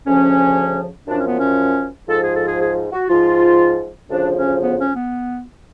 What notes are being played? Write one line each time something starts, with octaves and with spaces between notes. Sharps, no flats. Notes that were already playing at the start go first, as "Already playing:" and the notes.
D2 C#3 F3 C#4
F#2 F3 D4
C#4
B3
C#4
G#2 F3 A4
G#4
A4
G#4
G#4
F#4
G#2 F3 F4
D2 C#3 F3 D4
C#4
B3
C#4
B3